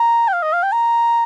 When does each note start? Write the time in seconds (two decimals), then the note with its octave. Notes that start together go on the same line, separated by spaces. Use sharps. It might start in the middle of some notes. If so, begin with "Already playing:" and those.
Already playing: A#5
0.28 G5
0.33 F5
0.42 D#5
0.53 F5
0.63 G5
0.72 A#5